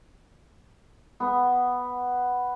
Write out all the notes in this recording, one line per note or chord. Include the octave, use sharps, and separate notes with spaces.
B3